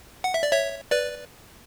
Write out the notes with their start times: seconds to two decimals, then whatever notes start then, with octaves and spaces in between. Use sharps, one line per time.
0.24 F#5
0.34 E5
0.43 D5
0.52 C#5 E5
0.91 B4 D5